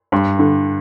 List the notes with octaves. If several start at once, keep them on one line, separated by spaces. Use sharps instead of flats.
G2
D3